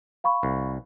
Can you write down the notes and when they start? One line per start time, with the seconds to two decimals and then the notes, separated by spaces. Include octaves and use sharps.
0.24 F5 B5 C#6
0.43 C2